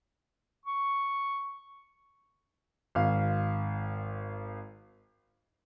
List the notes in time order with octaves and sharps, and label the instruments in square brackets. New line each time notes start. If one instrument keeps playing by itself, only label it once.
[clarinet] C#6
[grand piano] G#1 F5